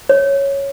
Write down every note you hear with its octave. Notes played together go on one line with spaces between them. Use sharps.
C#5